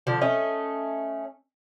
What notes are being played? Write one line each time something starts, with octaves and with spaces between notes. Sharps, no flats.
D3 F3 D4
A3 C#4 D#5